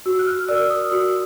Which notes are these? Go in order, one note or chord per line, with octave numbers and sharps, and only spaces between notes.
F#4 E6
F#6
F6
A#4 D5 E6
D#6
F#4 E6